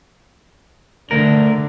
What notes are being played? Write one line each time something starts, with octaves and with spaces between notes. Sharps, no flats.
D2 D3 A#4